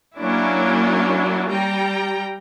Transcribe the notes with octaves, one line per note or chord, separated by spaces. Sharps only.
F#3 A#3 C#4 D4 E4
G3 G5 A#5